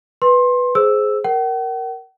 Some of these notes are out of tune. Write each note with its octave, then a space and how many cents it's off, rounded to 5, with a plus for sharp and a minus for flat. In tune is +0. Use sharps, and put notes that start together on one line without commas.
B4 +0 C6 +20
G#4 +15 C5 +0 E6 +0
A#4 +0 F#5 +45